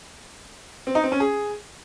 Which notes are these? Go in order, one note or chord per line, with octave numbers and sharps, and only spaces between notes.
C4
D#4
C4
C#4
G#4